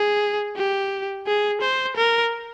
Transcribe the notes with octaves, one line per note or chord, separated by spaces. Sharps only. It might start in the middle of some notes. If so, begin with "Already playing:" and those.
Already playing: G#4
G4
G#4
C5
A#4